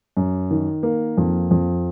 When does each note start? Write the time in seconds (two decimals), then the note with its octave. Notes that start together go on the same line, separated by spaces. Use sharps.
0.17 F#2
0.51 D#3
0.83 A#3
1.17 F2
1.51 F2